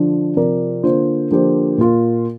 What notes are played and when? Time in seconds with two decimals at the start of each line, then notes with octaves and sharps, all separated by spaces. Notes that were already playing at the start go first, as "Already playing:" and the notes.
Already playing: D3 F3 D4
0.37 C3 F3 C4 A#4 D5
0.83 D3 A#3 F4 C5
1.31 D3 F3 A#3 G4 C5
1.78 A#2 A#3 F4